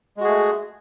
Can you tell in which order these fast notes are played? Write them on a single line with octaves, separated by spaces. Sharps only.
G#3 F#4 G#4 A3